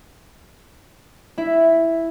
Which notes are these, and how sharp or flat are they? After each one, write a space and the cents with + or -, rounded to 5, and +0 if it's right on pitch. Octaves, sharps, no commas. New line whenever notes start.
E4 +0 E5 +0